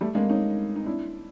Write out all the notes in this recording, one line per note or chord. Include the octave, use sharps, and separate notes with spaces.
G3 A3
G#3 A#3
C#4 D#4
D#4
D4 E4